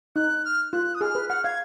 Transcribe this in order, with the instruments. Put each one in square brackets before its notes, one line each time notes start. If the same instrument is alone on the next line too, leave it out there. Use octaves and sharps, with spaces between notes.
[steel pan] D#4 [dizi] F#6
[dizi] F6
[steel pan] F4 [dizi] F#6
[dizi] D#6
[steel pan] G#4 [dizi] F6
[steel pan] B4
[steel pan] F#5 [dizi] F6
[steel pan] F5 [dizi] G#6